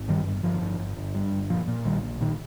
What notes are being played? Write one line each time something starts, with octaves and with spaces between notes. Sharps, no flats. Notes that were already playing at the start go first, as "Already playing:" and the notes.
Already playing: G#1
G2 D#3 G3
G1
G1 F3
G1
G1
G1
G2
G1
A#2 F3
A#2
A#1 D#3 G3
A#2
A#2 D#3